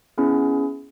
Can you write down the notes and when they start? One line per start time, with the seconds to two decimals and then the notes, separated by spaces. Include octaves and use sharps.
0.18 B3 C#4 E4 G#4